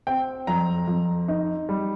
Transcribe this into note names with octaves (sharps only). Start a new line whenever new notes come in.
C4 G5
F2 A#5
F2
D#4
G3